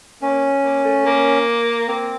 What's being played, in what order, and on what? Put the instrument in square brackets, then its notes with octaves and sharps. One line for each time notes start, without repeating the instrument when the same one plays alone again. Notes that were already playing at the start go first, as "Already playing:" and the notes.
[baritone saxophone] A#3 [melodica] C#4
[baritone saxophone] A#3
A3
A#3
[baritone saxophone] A#3 [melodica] C4